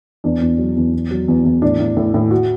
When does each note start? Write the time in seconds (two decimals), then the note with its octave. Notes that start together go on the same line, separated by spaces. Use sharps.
0.24 E2 D4
0.41 E2
0.58 F#3
0.76 E2
0.93 E2
1.11 F#3
1.28 E2
1.45 E2
1.62 A2 D4
1.79 A2
1.97 A2
2.14 A2
2.31 F#4